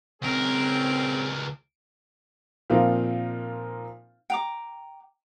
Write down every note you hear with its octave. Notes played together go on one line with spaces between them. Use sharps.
C#2 C4 C#4 G#4 A#4
A#2 F3 A#3 C4 D#4 F4
G5 A#5 D6